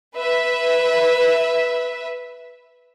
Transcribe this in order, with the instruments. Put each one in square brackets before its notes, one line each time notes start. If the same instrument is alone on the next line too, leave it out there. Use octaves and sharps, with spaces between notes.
[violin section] B4 E5